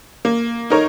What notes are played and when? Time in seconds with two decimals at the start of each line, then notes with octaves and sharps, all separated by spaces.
0.25 A#3
0.70 D#4 A#4 C#5